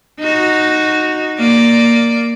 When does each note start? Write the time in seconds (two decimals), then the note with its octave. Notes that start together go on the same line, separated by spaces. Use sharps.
0.20 D#4 F#4
1.39 A#3 D5